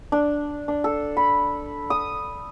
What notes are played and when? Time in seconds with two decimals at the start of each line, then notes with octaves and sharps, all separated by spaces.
0.12 D4
0.68 D4
0.84 A4
1.17 B5
1.90 D#6